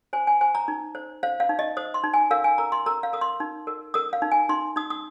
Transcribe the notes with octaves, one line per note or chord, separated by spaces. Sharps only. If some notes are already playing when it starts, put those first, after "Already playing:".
C5 G#5
G#5
C5 G#5
A#5
D#4
C5
C5 F5
F5
D#4
D#5
C5 D#6
C6
D#4
G#5
A#4 F5
G#5
A#4 A#5
C6
A#4 A#5
F5
A#4 D#6
C6
D#4
A#4
A#4 D#6
F5
D#4
G#5
D#4 C6
D#4 D#6
D#6